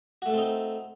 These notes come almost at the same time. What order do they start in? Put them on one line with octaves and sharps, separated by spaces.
F#4 A3 A4 C4 D#4